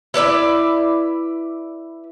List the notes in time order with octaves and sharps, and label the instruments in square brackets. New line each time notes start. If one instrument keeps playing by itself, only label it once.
[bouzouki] E4 B4 D5 E5